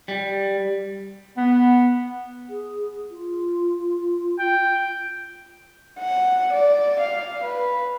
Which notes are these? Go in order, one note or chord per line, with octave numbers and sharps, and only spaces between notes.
G3
B3
G#4
F4
G5
F#5
D5
F5
B4